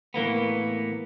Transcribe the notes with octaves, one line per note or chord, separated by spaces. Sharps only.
A2 E3 A#3 B3